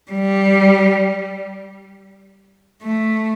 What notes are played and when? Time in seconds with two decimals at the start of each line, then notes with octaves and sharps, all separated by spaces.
0.11 G3
2.84 A3